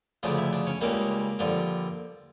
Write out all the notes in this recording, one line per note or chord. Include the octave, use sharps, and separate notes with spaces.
D2 C#3 F3 D4
E4
D4
C#4
C#2 C#3 G3 A#3
G2 D3 F3